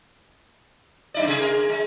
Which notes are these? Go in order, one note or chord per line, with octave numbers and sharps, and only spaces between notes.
F#2 D#4 D5
C3 G#4
A#4
G#3